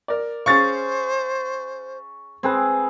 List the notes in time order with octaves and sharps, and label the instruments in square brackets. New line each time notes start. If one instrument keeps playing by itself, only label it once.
[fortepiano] A#4 D5
[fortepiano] C#4 G#4 F5 [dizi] C5 [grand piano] C#6 A6
[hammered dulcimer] C4 G#4 B4